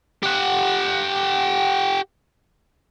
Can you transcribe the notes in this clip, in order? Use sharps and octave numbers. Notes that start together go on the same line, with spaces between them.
G4 F#5